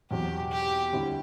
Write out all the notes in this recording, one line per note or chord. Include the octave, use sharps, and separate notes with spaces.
E2 B2 F#3 C4 G4
G4
D2 D3 G3 C4 E4